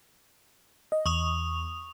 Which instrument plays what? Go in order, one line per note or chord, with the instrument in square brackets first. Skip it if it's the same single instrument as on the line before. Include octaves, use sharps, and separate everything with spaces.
[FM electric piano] D#5
[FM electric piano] E2 [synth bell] C#6 D#6 F7